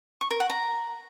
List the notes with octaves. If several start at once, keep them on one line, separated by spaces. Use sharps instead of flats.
C#6
A#4
F#5
A#5